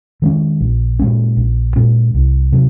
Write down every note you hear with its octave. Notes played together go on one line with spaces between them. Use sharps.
D#3 G#3 C#4
A#1
A#2 G#3 C#4
A#1
A#2 G#3 C#4
C2
C3 F#3